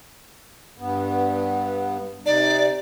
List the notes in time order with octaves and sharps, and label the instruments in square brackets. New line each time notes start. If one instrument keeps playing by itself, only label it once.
[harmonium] G2 B3
[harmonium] C3 D#4 [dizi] D5